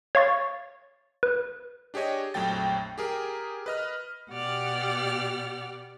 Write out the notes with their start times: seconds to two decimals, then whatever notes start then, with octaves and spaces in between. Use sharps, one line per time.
0.15 C#5 F5 C#6 A6
1.23 B4
1.94 D4 G4 G#4 C#5 D#5
2.34 A#1 F2 F#3 A3 G5 A6
2.98 G4 G#4 A#4
3.66 B4 D#5 F6
4.30 B2 G4 D5 F#5 F6